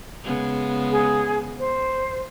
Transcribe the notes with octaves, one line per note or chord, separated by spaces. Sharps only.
C#3 G#3 B3
G#4
C5